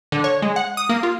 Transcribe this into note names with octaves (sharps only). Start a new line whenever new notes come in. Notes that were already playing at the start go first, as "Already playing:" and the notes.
D3
C#5
G#3
F#5
D#6
A#3
F4